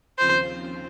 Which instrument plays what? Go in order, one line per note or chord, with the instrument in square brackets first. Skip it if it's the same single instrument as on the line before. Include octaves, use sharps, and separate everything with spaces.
[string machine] D#2 C#3 F3 C4 F4 [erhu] C5